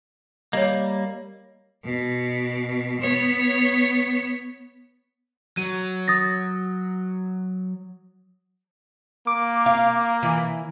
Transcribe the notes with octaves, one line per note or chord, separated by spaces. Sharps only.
G3 A#3 C#5 D#5
B2
B3 C#5
F#3 D#7
D#6 A6 A#6
A#3 D6
F5
E3